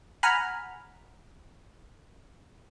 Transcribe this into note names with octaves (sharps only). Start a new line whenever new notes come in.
F#5 G#5 A#5 B5 F6